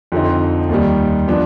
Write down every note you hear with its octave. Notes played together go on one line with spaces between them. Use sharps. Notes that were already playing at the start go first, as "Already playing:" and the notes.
F2 D3 F3 C4 D#4
D#2 D#3 G3
F3 B3 D4